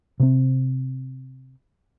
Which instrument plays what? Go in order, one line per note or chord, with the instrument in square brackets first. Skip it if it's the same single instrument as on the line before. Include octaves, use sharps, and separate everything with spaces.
[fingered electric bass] C3 C4